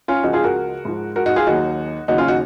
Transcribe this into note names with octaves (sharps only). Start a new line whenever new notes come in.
C#4 F4
C#2 C#3 F3 D#4 F#4
F4 G#4
F#4 A#4
G#2 F3
F#4 A#4
D#4 F#4
F4 G#4
D#2 D#3 F#3 D#4 F#4
D#2 C#3 F#3 D#4 F#4
C#4 F4
D#4 F#4